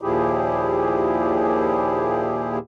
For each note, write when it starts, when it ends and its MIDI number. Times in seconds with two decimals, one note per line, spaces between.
0.01 2.58 39
0.01 2.58 46
0.01 2.58 53
0.01 2.58 64
0.01 2.58 67
0.01 2.58 68